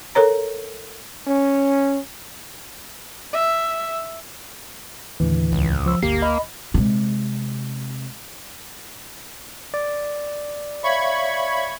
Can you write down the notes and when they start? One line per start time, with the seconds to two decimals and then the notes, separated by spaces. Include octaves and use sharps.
0.15 A4 A#4 C#5 A#5
1.28 C#4
3.33 E5
5.20 D#2 A2 D3 E3
5.52 C#2
5.86 F3 E6
6.02 G1 D2 A#3 G4 C7
6.22 D#5 B5
6.74 C3 G#3
9.74 D5
10.83 C#5 E5 F5 B5 C#6 G#6